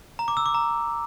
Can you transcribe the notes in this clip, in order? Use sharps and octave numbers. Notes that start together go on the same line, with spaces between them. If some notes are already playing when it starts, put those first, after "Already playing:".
A#5
D6
E6
D6
A#5